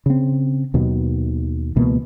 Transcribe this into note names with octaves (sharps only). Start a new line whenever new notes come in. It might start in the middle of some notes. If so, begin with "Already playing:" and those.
C#3 C4
D#2 B2 D#3 F#3
C#2 B2 E3 A#3